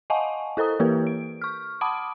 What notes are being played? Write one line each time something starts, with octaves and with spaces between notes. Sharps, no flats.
D#5 F5 F#5 G#5 A5 C#6
E4 A4 C5 A#5 D#6
E3 A#3 E4 G4 A#4 B4
D7
C#6 F6
F#5 A5 B5 D6 D#6 D7